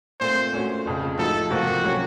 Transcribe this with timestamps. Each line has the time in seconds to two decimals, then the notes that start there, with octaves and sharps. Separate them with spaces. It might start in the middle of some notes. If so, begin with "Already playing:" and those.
0.20 A#2 A3 C4 C5
0.53 A#2 A3 C#4 F#4
0.86 F1 F2 C#3
1.18 A2 F3 A3 D#4 F#4 A4
1.50 C#2 C3 F3 A#3 F#4
1.84 C3 F#3 A#3 C#4